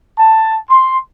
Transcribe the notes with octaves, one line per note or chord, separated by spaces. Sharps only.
A5
C6